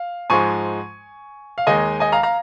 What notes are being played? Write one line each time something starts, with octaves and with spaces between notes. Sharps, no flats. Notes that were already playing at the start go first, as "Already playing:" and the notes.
Already playing: F5
G#2 F3 G#3 G#5 C#6
F5
D#2 D#3 G#3 D#5 G#5
D#5 G#5
F5 A#5
F5 A#5